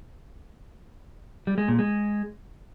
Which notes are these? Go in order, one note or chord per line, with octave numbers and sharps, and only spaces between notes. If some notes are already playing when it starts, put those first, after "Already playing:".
G3
G#3
A#2
G#3